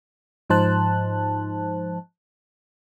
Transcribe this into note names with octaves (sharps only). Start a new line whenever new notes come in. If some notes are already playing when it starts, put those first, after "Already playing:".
G#2 F3 D#4 C5 A5 F#6